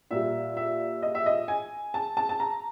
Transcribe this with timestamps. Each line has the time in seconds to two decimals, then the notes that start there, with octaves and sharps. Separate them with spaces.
0.11 A#2 G3 E5
0.57 E5
1.02 D#5
1.15 E5
1.26 D#5
1.48 G#5
1.94 A5
2.17 A5
2.29 A5
2.40 A#5